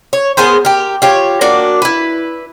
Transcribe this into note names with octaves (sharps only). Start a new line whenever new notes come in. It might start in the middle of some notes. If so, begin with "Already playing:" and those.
C#5
B3 G#4 A#4 C5
G4 A#4
F4 G4 C#5
A#3 D4 F#4 D5
E4 B4